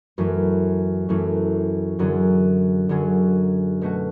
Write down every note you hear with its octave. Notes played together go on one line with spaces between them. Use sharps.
F#2 E3 A3 C#4
F#2 E3 A3 C#4
F#2 D3 F#3 C#4 G#4
F#2 D3 F#3 C#4 G#4
B2 A3 C#4 F#4